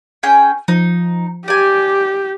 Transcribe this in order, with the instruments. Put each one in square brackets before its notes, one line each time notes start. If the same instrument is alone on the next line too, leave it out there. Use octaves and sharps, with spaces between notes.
[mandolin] C#4 G#4 G5
[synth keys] F3 [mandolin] D#4
[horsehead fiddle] G4 [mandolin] D5 G#5 [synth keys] G6